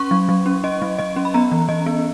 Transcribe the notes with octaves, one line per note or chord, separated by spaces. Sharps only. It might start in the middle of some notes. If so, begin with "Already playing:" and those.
Already playing: C#4 C#6
F#3
F#3
C#4
C#4 D#5
F#3
F#3 D#5
C#4
B5
B3 A#5
E3
E3 D#5
B3